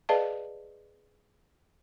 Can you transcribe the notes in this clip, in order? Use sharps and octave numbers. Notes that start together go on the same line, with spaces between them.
G#4 B4 D5 D#5 F5 A5